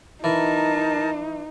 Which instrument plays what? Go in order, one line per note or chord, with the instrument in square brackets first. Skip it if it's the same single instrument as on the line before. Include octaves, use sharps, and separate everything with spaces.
[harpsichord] E3 [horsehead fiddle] D#4 [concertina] A#4 A5